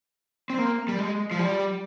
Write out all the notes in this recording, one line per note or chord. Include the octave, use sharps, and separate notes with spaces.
C4
A#3
G3
G#3
F3
G3